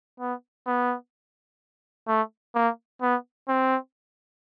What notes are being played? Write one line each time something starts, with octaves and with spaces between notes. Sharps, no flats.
B3
B3
A3
A#3
B3
C4